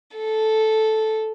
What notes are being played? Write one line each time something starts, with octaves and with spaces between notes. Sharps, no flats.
A4